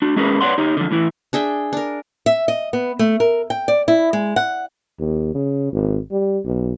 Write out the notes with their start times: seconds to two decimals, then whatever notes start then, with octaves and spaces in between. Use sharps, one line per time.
0.02 D4 F#4
0.16 G#3 C#4 G#4 A#4 B4
0.41 B4 C#5 D5 F#5 C6
0.58 D#4 G4 C#5
0.77 D3 F3
0.91 A2 E3 E4
1.33 D4 G#4 E5 G5
1.73 D4 A#4
2.26 E5
2.48 D#5
2.73 B3
2.99 A3
3.20 A#4
3.50 G5
3.68 D5
3.88 E4
4.13 G#3
4.36 F#5
4.99 D#2
5.34 C#3
5.72 G#1
6.11 G3
6.45 B1